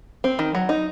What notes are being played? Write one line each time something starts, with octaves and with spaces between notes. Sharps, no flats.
C4
D#3
F#3
D#4